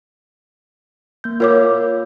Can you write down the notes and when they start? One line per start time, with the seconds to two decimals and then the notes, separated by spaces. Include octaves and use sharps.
1.24 A#3 G6
1.40 F4 A#4 C#5 D6 E6